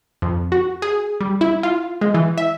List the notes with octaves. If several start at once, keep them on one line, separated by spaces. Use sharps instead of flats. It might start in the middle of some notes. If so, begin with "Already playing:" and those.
F2
F#4
G#4
G3
E4
F4
G#3
E3
E5